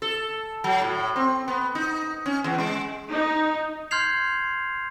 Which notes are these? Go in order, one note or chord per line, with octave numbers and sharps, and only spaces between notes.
A4
F#3
A2
C4
B3
D#4
C#4
E2
G#3
D#4
C6 F6 G6 G#6 C7 F7